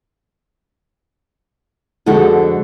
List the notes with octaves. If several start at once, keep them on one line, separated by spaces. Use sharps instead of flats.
F2 D3 G#3 F#4 A4